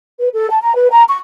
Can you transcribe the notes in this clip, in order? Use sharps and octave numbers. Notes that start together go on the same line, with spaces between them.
B4
A4
A5
A#5
B4
A#5
C#6